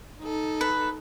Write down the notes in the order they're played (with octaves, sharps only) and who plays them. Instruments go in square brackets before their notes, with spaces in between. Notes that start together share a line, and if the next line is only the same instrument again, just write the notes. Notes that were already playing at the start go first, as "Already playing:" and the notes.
[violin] D#4 A4
[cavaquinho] B4